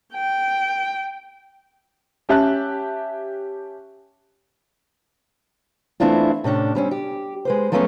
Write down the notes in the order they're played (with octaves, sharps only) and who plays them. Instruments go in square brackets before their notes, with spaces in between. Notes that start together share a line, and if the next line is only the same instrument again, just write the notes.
[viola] G5
[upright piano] C#4 G4 E5 A5 F#6
[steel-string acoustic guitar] E3 A3 C4 D4 E4 F4
A2 C3 C#4 D4
G3 C4 C#4
G4
G#3 B4 C5
F3 F#3 G#3 A3 B3 C#4